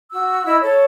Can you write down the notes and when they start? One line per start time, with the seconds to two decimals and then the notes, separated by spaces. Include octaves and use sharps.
0.12 F#4 E6
0.45 E4 D#5 B5 E6
0.62 A4 C#5